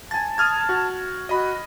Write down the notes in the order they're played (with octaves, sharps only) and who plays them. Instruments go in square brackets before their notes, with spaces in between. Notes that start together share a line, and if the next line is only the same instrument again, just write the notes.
[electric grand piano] G#5 A6 [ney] A5
[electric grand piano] D#6 F6 G#6
F#4
[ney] F#4 [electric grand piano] D#5 B5